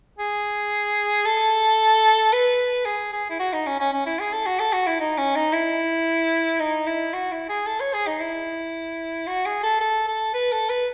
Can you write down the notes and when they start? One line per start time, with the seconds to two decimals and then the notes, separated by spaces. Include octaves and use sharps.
0.19 G#4
1.26 A4
2.33 B4
2.86 G#4
3.13 G#4
3.30 E4
3.40 F#4
3.53 D#4
3.66 C#4
3.80 C#4
3.93 C#4
4.06 E4
4.20 G#4
4.33 A4
4.46 F#4
4.60 A4
4.73 F#4
4.87 E4
5.00 D#4
5.18 C#4
5.36 D#4
5.53 E4
6.60 D#4
6.87 E4
7.14 F#4
7.32 E4
7.49 G#4
7.66 A4
7.80 C#5
7.94 G#4
8.07 D#4
8.20 E4
9.27 F#4
9.46 G#4
9.63 A4
9.81 A4
10.08 A4
10.34 B4
10.52 A4
10.70 B4